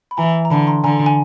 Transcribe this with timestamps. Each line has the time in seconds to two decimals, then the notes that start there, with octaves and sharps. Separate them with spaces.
0.11 B5
0.17 E3 G#5 A#5
0.45 A#5
0.50 D3 A5 B5
0.67 A#5 C6
0.84 D3 G#5 A#5
1.06 G#5